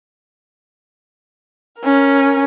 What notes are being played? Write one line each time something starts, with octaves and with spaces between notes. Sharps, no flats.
C#4 A#4